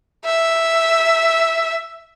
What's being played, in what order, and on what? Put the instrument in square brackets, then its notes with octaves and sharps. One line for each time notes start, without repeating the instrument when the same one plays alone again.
[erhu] E5